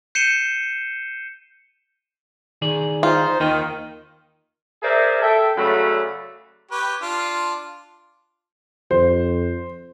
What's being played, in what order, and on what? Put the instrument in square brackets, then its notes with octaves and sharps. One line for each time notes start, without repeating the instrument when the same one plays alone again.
[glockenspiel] G6 C7 C#7 D#7 E7 G7
[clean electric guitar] D#3 G#4 D5
[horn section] D#4 C5 [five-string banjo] F4
[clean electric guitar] D#2 D#5 G5 [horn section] D#3
[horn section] G#4 A#4 C5 D5 E5
A4 E5 G5
F#2 C#3 F#3 A3 D5 B5
[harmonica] G4 B4 C#5
D4 F4
[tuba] F2 [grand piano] C5